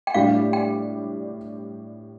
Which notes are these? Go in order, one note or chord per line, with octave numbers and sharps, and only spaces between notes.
G5
A2 G3 D4 G4 F5
G5